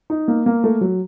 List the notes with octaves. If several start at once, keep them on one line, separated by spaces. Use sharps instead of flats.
D#4
A#3
A#3
A3
F#3